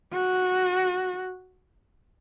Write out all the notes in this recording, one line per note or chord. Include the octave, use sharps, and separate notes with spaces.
F#4